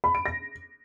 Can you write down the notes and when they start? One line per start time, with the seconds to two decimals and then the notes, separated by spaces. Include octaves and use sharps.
0.04 B5
0.15 D7
0.26 A#6